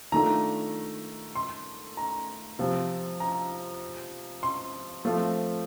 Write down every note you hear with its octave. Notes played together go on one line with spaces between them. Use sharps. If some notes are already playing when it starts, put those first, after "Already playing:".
D#3 A3 D4 F4 A#5
C6
A#5
C3 F3 C4 F4
A#5
C6
F3 A3 C4 F4